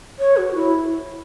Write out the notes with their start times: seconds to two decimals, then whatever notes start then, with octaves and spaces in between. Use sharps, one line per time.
0.19 C#5
0.37 F#4
0.55 E4